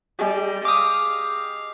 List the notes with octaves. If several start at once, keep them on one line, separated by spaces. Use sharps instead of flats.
G3 G4 G#4 D#5
F5 D6 D#6